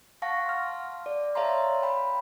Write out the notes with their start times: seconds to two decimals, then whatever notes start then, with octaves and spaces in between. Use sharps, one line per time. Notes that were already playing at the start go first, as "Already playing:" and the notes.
0.22 F5 F#5 A5 C#6 A#6
0.45 C6 F6
1.06 D5
1.35 C#5 E5 F5 A5 A#5 C6
1.83 G5 B5